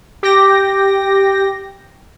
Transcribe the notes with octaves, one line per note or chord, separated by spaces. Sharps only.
G4 G5 A#6